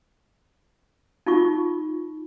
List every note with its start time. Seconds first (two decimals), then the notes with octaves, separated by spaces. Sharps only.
1.26 D#4 F4 C#6